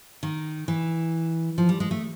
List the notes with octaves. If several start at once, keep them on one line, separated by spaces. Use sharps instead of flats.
D#3
E3
F3
G3
G#3
A3